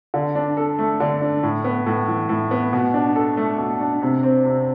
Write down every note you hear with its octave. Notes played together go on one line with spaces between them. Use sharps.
D3
D4
A4
A3
D3
D4
A2
B3
A2
E3
A2
B3
B2
D4
A4
A3
B2
D4
C3
C4
C3